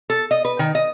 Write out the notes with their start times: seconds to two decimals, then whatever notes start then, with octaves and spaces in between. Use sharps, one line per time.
0.10 A4
0.31 D#5
0.45 B4
0.59 D#3
0.75 D#5